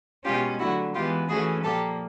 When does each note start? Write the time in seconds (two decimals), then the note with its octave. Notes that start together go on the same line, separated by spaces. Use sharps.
0.24 B2 G#3 C#4 F4 G4
0.59 D3 F#3 A3 E4 F#4
0.94 E3 G#3 B3 F4 G4
1.29 E3 A3 C#4 F#4 G#4
1.64 A#2 F3 A#3 G4 A4